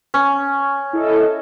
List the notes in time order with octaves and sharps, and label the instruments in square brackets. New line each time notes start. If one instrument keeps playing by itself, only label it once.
[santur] C#4
[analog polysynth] E4 A4 D#5